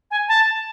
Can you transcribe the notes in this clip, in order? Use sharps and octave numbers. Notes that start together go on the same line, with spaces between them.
G#5
A5